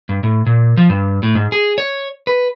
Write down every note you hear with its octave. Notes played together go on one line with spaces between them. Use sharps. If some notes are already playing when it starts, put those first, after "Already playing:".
G2
A2
A#2
F3
G2
A2
G#2
G#4
C#5
B4